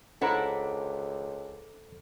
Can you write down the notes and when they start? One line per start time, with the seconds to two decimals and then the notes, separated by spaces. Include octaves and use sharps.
0.21 C#2 D4 E4 A4 C5 F#5 A#5